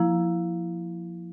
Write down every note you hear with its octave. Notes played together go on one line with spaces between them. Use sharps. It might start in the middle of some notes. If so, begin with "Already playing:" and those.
Already playing: F3 A#3 E4